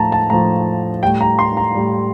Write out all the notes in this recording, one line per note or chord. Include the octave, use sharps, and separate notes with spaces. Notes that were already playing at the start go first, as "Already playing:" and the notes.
Already playing: A2 F3 A5 A#5
A5
A2 F3 A#5
A2 G3 G5
A#5
C6
A#5
A2 G3